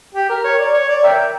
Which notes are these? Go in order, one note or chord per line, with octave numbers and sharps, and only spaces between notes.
G4
A#4
C#5
D5
C#5
D5
A#4 E5 G5